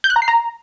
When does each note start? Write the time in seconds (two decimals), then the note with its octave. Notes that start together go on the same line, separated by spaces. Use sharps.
0.04 G6
0.10 F#6
0.16 A#5
0.22 C7
0.28 A#5